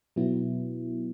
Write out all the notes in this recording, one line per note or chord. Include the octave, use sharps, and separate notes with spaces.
B2 F#3 B3 E4